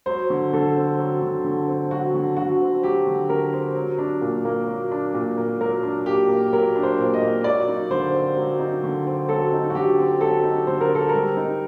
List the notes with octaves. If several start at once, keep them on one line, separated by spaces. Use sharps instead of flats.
F#3 C5
D3
D3 A4
C4
F#3
D3
D3
C4
F#3 F#4
D3
D3 F#4
C4
F#3 G4
D3
D3 A#4
C4
F#3
D4
A#2
A#3
F#3
D4
A#2
A#3
F#3 A#4
D4
A#2 G4
A#3
F#3 A#4
D4
C5
A#2
D#5
A#3
F#3 D5
D#4
D3 C5
C4
F#3
D#4
D3
C4
F#3 A4
D#4
F#4
D3 G4
C4
F#3 A4
D#4
D3 C5
A#4
C4 A4
G3 A#4
D#4